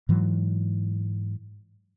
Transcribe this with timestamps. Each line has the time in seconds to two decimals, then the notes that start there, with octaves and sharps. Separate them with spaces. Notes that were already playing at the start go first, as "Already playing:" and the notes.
0.09 G#2 E3 F#3